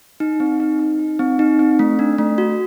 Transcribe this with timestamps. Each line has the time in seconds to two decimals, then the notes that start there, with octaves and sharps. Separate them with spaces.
0.20 D#4
0.40 C4
0.60 D#4
0.79 D#4
0.99 D#4
1.19 C4
1.39 D#4
1.59 C4
1.79 A3
1.99 D4
2.18 A3
2.38 F#4